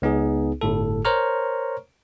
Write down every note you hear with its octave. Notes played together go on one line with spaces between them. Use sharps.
C#2 B3 D#4 G#4
G1 A2 A4
A#4 C5 C#5 A#5 C#6 F6